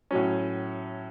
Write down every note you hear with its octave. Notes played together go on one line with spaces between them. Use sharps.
A2 F#3 C#4